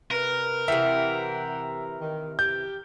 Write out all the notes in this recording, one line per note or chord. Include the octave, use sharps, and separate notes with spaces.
C3 A#4 B4
C3 E3 E5 F#5 G5
D#3
G4 G6